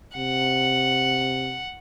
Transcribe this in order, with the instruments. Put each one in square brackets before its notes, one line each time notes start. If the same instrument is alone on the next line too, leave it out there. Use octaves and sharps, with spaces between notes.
[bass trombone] C3 [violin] F#5